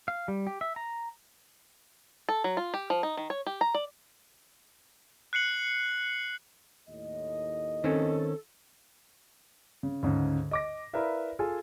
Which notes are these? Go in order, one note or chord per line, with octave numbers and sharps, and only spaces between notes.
F5
G3
G4
E5
A#5
A4
F#3
F4
G4
F3
D#4
D#3
C#5
G4
A#5
D5
F#6 C7 C#7 F#7
D#2 A2 D#5
D#3 C4 C#4 A4
C#3
D2 G#2 C#3
D#5 D6 A#6
E4 A#4 B4 D5 E5 F5
F4 G#4 A4 G#5